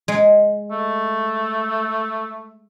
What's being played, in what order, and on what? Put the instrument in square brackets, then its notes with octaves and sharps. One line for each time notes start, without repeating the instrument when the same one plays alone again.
[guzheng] G#3
[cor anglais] A3